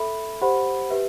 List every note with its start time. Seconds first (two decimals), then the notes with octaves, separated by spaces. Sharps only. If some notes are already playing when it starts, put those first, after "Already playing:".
Already playing: A4 E5 B5
0.41 G4 C5 F#5 B5
0.90 G4 B4 E5